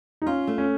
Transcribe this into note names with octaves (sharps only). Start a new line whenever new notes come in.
D#4
C#4 F4
A3
C#4